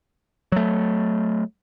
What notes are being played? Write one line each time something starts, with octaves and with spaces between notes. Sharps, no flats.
F#3 A3